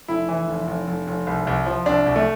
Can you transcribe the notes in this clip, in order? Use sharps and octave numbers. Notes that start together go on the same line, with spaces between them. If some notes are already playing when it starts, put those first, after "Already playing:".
F1 E4
E3
F1
F1
F1
F1
C2
C2
F3
C2 D4
C2
A3